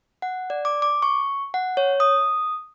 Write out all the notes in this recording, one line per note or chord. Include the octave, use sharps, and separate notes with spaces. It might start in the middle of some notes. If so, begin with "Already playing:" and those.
F#5
D5
D6
D6
C#6
F#5
C#5
D#6